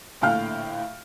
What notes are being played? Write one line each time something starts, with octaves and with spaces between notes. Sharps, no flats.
A#1 A2 D3 F5 G5 F6